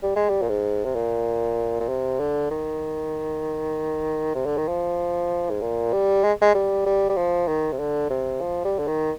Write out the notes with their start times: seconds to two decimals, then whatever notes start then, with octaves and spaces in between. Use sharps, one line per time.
0.03 G3
0.16 G#3
0.29 G3
0.42 A#2
0.49 G#2
0.85 C3
0.95 A#2
1.80 A#2
1.89 C3
2.20 D3
2.51 D#3
4.35 C3
4.45 D3
4.57 D#3
4.68 F3
5.50 G#2
5.61 A#2
5.93 G3
6.24 G#3
6.41 G#3
6.54 G3
6.86 G3
7.09 G3
7.17 F3
7.48 D#3
7.72 C3
7.79 D3
8.10 C3
8.41 F3
8.64 G3
8.78 D3
8.87 D#3